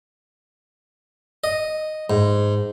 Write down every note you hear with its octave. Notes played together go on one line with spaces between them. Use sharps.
D#5
G#2